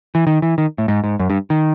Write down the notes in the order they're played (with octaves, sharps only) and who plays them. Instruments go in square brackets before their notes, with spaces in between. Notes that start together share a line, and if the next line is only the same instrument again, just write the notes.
[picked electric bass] E3
D#3
E3
D#3
A2
G#2
G#2
F#2
G2
D#3